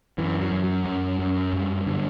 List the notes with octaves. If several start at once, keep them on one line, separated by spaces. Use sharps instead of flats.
F#2 E3
F#3
F#2
F#3
F#2
F#2
G2
D3